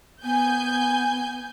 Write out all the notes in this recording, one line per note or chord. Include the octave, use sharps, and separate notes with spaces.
B3 G#5 G6